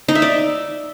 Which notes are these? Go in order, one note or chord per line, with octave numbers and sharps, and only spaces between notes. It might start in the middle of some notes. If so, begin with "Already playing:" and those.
D#4
E5
D5